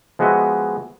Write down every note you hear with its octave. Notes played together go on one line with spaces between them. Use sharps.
F3 G#3 B3 F#4 D#5 E5